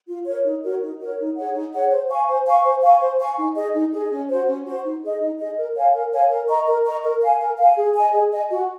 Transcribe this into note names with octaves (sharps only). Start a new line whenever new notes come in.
F4
A#4 C#5
D#4
F#4 A#4 C#5
D#4
F#4 A#4 C#5
D#4
G#4 C#5 F#5
D#4
G#4 C#5 F#5
C5
F5 G#5 C#6
C5
F5 G#5 C#6
C5
F5 G#5 C#6
C5
F5 G#5 C#6
D#4
G#4 D#5
D#4
G#4 D#5
C#4
F#4 C5
C#4
F#4 C5
D#4
G#4 D#5
D#4
G#4 D#5
A#4
C#5 F5 G#5
A#4
C#5 F5 G#5
A#4
D#5 A#5 C#6
A#4
D#5 A#5 C#6
A#4
F5 G#5
A#4
F5 G#5
G#4
D#5 G#5
G#4
D#5 G#5
F#4